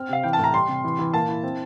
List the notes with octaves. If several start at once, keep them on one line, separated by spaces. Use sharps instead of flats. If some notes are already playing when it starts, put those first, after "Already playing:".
Already playing: C4 F6
C3 F5
E3 G5
A5
A2 A#5
G3 C6
C3
E3
E3
A#2 A5
E4
C4